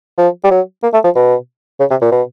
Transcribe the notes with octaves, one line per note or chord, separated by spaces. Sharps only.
F3
G3
F#3
A#3
A3
F3
B2
C#3
C3
A#2
B2